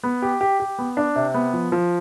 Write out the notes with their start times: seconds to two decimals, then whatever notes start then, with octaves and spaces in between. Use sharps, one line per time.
0.03 B3
0.22 G4
0.41 G4
0.60 G4
0.79 B3
0.97 D4
1.16 C3
1.34 B3
1.53 F3
1.72 F3